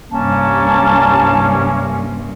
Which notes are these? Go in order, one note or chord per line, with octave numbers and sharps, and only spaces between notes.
C2 G2 A#3 C#4 A5